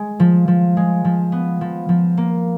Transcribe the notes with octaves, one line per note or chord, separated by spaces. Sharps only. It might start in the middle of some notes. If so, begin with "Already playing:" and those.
Already playing: G#3
F3
F3
G#3
F3
B3
F3
F3
A#3